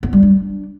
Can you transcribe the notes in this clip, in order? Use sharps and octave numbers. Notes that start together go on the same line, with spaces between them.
B3
G3
D4